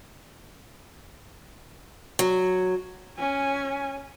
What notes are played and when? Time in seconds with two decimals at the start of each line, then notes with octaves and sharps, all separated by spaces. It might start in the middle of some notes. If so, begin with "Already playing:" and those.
2.19 F#3
3.18 C#4 G#5